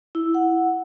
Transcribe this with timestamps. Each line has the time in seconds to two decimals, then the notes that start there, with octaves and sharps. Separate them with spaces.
0.15 E4
0.34 F#5